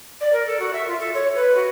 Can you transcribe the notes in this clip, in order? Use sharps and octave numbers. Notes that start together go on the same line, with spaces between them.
D5
A#4
A4
F#4
E5
F4
A4
C#5
B4
F#4